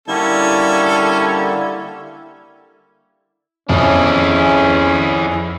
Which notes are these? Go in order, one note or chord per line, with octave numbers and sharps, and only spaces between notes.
D3 G3 A#3 C#4 E4 A4
F2 C#4 E4 G#4